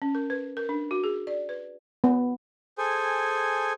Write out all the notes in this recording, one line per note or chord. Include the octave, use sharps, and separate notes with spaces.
C#4
A#4
B4
A#4
D4
F#4
G#4
D5
B4
B3
G#4 A4 C5 G#5